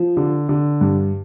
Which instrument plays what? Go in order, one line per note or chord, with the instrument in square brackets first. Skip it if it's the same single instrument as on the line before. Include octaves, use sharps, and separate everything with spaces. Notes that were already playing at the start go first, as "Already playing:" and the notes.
Already playing: [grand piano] F3
D3
D3
G2